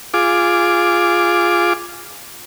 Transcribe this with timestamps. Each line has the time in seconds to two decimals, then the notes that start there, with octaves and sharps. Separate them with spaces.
0.14 F4 G#4 D6